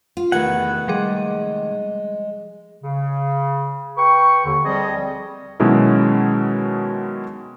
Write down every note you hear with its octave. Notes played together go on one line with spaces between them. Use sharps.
F4
E2 C3 D#3 A3 B4 F#5 G#6
F3 G3 G#3 G#4
C#3
B4 G5 C#6
D#2 D3
F3 G3 C4 G#4 D#5
B2 D#3 F#3 G#3 C#4 E4